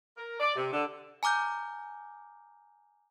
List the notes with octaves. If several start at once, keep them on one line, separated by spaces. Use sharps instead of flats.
A#4
D5
C3
D3
G#5 A#5 D6 F6 G6